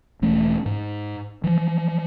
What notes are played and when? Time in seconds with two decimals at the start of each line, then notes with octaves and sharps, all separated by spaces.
0.22 E1 E3 A3 C#4
0.66 G#2
1.44 E3 F3